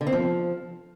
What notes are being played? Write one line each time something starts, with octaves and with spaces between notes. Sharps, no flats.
D3
C4
F3